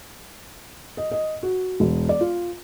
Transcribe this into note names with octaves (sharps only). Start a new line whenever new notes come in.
D#5
D#5
F#4
E1
D5
F4